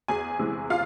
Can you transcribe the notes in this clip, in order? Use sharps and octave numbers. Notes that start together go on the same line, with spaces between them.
E2 G#4 G#5
C3 E3 G#3
F4 F5